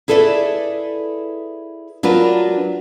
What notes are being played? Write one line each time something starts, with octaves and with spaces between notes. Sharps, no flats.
E4 G#4 A4 B4 D5 E5
F#3 D4 F4 A#4 B4